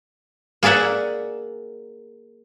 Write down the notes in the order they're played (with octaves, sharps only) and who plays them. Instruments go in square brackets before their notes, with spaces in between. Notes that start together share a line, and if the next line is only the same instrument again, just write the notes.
[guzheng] A#3 G#4 D5 E5 F#5